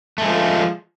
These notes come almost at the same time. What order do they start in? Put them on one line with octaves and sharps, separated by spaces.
A3 G#3 F3